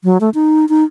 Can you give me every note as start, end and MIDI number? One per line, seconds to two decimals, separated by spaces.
0.04 0.18 54
0.21 0.30 57
0.34 0.65 63
0.69 0.84 63